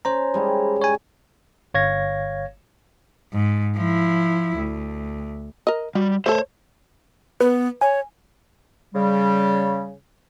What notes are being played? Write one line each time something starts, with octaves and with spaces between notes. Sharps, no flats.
C#4 C5 A#5
G3 G#3 E4
C#5 G#5
G1 C#5 F5 G#6 A#6
G#2
F3 E4
D2
A#4 D#5
F#3 G3
A3 A4 C5 C#5
B3 B4
C#5 G#5
C#3 G3